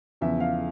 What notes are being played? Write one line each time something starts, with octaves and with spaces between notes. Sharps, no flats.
E2 C#3 F3 E5
F5